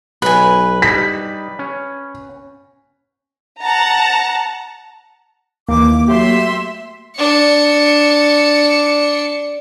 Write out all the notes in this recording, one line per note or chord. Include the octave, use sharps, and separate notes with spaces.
B1 B4 G#5
G3 D#4 B6
C#4
F#5 A5 A#5
D#2 E3 A#3 D6
F#3 A3 G4 E5 C6
D4 C#7